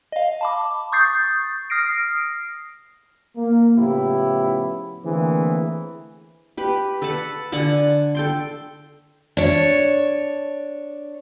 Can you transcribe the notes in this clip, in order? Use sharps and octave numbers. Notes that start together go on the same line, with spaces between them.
D#5 F5
A5 B5 D6
C#6 D#6 G6 A6 C7
D#6 F6 A#6 C7 D7
A#3
A2 C#3 F3 B3 E4 G4
D3 E3 A3 A#3 C4 G#4
G4 B4
A4 B4 F#5 A5
D3 F#5 G#5 A5
A4 G5 C6
D4 C#5